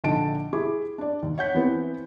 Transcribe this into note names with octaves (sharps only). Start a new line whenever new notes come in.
A#1 D3 D4 D#4 A5 D7
E4 G4 G#4 D6
D4 D5
D#2
C#5 F#5 G6 B6
E3 B3 C4 E4